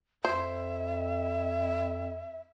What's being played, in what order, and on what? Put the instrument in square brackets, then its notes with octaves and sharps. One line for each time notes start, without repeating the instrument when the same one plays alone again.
[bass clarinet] F2 [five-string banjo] C5 [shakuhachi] E5